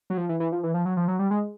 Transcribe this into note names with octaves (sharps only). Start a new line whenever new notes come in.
F#3
F3
E3
E3
F3
E3
F3
F#3
F3
F#3
G3
G#3